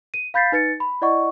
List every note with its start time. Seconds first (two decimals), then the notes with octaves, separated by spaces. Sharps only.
0.14 D#7
0.34 F5 B5 G6 A6 B6 C7
0.52 D#4 B4 A6 C#7
0.80 B5
1.02 E4 D5 D#5 F#5 C#6